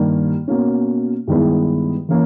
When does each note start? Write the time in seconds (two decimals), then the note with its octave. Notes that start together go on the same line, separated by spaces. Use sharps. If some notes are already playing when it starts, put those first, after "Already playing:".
Already playing: G2 D#3 A#3
0.48 B2 A#3 C#4
1.28 G2 D#3 G#3 B3 E4
2.09 E3 A#3 C#4